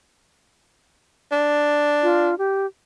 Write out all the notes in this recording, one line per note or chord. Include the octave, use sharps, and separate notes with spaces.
D4
F4
G4